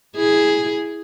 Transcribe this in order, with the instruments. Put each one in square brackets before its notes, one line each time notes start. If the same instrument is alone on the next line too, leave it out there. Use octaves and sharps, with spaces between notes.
[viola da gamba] E4 G#4